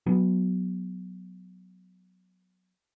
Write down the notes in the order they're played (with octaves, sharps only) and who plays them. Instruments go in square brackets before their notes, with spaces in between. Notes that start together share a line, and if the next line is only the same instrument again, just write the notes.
[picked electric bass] F#3 B3